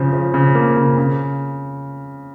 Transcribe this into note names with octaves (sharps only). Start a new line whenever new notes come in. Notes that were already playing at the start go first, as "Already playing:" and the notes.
Already playing: C#3 F3
F3
C#3
A#3
C#3
C#3